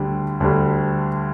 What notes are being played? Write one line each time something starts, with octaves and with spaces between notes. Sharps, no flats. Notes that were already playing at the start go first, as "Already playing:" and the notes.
Already playing: D2 D3 G3
D2 D3 G3